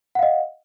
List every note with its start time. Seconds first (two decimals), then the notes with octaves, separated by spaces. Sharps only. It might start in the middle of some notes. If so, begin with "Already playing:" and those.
0.15 F#5
0.19 F5
0.23 D#5